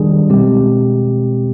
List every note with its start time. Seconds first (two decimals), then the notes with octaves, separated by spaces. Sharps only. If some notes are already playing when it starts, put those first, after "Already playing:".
Already playing: D#3 G3 D4 G#4
0.29 B2 G#3 C4 G4